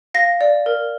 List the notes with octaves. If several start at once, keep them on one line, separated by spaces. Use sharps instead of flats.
F5 A#6
D5
A#4